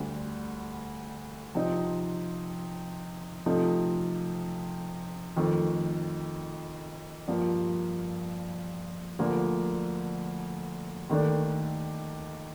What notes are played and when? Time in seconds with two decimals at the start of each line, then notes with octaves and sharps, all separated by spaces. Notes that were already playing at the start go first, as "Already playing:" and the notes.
Already playing: D2 D3 G3
1.55 C3 F3 C4 D#4
3.46 C3 F3 A3 D#4
5.37 F2 D#3 A3
7.28 G2 F3 A#3
9.19 D2 D3 F3 A#3 D4
11.10 D#2 D#3 A3 D4